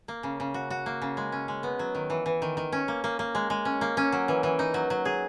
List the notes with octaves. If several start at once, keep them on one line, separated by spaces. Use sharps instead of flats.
A#3
C#3
C#3
F#4
F#4
A#3
C#3
G#3
C#4
G#3
B3
F#3
D#3
E3
E3
D#3
D#3
C#4
A#3
A#3
A#3
G#3
G#3
C#4
A#3
C#4
F#3
E3
E3
D#4
F#3
F#3
G#4